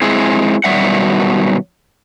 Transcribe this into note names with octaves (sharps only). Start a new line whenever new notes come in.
G#3 C4 E4 G#4
B2 D#3 F#3 G3 E5 F#5